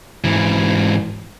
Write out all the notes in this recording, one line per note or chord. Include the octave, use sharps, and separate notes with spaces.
G#2 E3